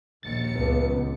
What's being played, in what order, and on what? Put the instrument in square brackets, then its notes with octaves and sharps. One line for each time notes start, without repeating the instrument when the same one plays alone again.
[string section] A#1 D#2 C#7 [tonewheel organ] A6
[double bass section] C#2 [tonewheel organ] B3